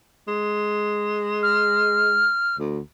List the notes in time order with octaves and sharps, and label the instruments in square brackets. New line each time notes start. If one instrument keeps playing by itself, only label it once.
[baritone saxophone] G#3
[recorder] F6
[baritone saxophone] D2